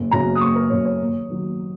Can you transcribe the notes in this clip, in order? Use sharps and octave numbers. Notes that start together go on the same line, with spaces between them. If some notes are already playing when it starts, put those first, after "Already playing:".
Already playing: F#1
F#2 C#3 F#3 A#5
D#6
F#1 C#6
A#4
F#2 C#3 F#3 C#5
C#5
D#2
D#3 F#3